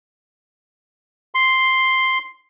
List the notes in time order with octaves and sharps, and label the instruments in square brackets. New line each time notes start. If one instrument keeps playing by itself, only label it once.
[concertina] C6